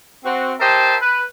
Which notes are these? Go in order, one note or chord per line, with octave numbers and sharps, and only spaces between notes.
C4 F#4
G4 A#4 C5 D#5 E5 A5
B4